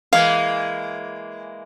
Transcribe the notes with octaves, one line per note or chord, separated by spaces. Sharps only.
E3 G#3 A#3 F5